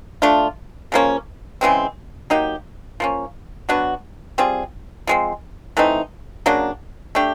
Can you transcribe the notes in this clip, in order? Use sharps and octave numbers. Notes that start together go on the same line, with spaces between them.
A3 D4 F4
C#3 F3 A#3 C#4
C#3 E3 G#3 C4
F#3 A#3 D#4 G4
F3 A#3 C#4
F#3 B3 D4 F#4
G3 C4 F4 G#4
F3 G#3 C4
E3 A3 C4 D#4
C#3 F#3 A#3 D4
A3 D4 G4